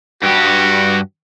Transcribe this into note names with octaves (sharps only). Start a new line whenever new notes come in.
G2 F#4 G4